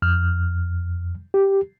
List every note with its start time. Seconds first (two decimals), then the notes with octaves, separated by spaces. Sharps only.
0.02 F2 F6
1.34 G4